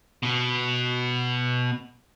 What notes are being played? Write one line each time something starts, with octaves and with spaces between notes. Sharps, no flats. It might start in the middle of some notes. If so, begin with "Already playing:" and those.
B2 B3